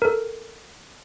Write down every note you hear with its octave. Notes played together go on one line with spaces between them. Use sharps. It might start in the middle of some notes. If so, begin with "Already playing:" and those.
A4 A#4